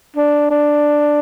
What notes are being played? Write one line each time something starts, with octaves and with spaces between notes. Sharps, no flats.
D4
D4